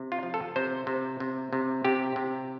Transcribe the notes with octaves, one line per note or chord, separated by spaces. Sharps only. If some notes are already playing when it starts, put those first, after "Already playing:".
Already playing: C3
F4
F3
A4
C3 C5
C3
C3
C3
C3 G4
C3